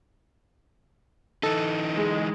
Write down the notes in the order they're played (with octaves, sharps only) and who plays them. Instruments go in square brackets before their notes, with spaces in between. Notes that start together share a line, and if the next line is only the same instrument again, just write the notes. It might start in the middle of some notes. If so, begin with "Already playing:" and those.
[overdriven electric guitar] E3 D#4 [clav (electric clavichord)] A4
[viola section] G#3